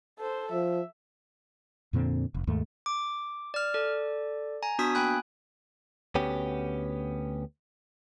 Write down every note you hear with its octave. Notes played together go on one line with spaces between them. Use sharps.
A4 C5
F3 E5
F2 A#2 D3 C4
F1
D#2 G#2 A3
D6
D5 F6
A4 D5
G#5 A#5
B3 D4 F#4 D#6 G#6 B6
A#3 G5 G#5 B5 F#6
D2 B3 C#4 G4